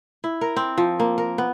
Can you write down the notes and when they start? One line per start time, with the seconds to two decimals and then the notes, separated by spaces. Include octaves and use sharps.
0.24 E4
0.41 A#4
0.56 C4
0.78 F3
1.00 A#3
1.18 A#4
1.38 B3